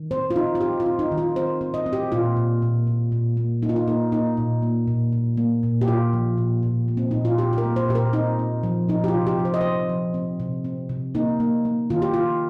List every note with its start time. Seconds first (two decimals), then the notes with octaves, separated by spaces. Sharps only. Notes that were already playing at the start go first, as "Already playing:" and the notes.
Already playing: D#3
0.11 C4 C5
0.30 F4
0.36 C4 D#4
0.55 F4
0.61 C4 G4
0.80 F4
0.86 C4
0.99 D#4
1.12 D#3
1.18 F4
1.36 C4 C5
1.61 C4
1.74 D#5
1.86 C4
1.93 G4
2.12 A#2 F4
2.37 A#2
2.62 A#2
2.87 A#2
3.12 A#2
3.37 A#3
3.62 A#3 D#4
3.69 F4
3.76 D#4
3.88 A#3 D#4
4.12 A#3 D#4
4.37 A#2
4.62 A#3
4.88 A#2
5.12 A#2
5.37 A#3
5.63 A#2
5.81 G4
5.88 A#2 F4
6.13 F3
6.38 A#2
6.63 A#2
6.88 A#3
6.97 C4
7.11 A#2 D#4
7.25 F4
7.38 A#2 G4
7.53 G4
7.58 A#4
7.64 A#3
7.76 C5
7.89 A#2 G4
7.95 A#4
8.13 C4 D#4
8.39 C4
8.63 F3
8.89 F3 D#4
9.04 G4
9.08 F4
9.14 C3
9.27 G4
9.39 F3
9.45 C5
9.54 D#5
9.61 C4 C5
9.89 F3
10.14 C4
10.40 C3
10.64 C4
10.89 C3
11.15 A#3 D#4
11.40 A#3
11.65 A#3
11.90 D#3 F4
12.02 G4
12.14 D#3 F4